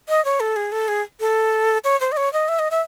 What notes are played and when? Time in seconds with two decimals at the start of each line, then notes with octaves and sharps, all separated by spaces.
0.09 D#5
0.25 C#5
0.40 A4
0.56 G#4
0.72 A4
0.88 G#4
1.20 A4
1.84 C#5
2.00 C5
2.12 D#5
2.17 C#5
2.33 D#5
2.48 E5
2.59 D#5
2.71 E5